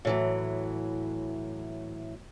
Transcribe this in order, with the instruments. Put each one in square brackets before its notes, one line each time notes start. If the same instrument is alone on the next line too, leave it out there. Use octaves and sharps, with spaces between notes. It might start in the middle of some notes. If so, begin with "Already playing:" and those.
[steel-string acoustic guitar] A2 E3 F#3